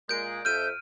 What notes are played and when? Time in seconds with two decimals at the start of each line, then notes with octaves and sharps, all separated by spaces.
0.09 A#2 G#3 G6 D7
0.45 F2 E5 F6 G6 D#7